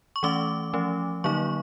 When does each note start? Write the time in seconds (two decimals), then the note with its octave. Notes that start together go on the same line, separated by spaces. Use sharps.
0.16 C#6
0.23 E3 A3 C#4 D6
0.74 F3 A3 C#4
1.24 D3 F#3 A#3 D#4 C#6